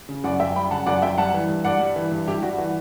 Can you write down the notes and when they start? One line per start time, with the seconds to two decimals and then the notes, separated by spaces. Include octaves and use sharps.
0.09 C#3
0.24 F#2 D5 F#5
0.40 F#2 E5 G5
0.56 G3 G5 B5
0.71 C#3 F#5 A5
0.86 F#2 D5 F#5
1.02 F#2 E5 G5
1.18 G3 F#5 A5
1.34 E3
1.49 G2
1.65 G2 D5 F#5
1.80 G3
1.96 E3
2.11 G2
2.27 G2 E4 G4
2.42 G3 F#4
2.58 E3 F#4